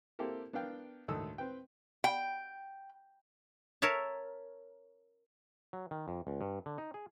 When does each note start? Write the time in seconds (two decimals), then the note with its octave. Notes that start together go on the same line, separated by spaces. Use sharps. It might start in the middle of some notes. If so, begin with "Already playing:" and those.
0.19 A#3 C4 E4 G4 A4 A#4
0.53 B3 D4 A#4 F5 G5
1.08 D2 A2 D#3 A4 D#6 E6
1.38 C4 B4 G5
2.04 G5
3.82 A#4 C#5 E5 A5
5.73 F#3
5.91 D#3
6.08 F2
6.27 C#2
6.41 G2
6.66 D3
6.78 D#4
6.94 G#4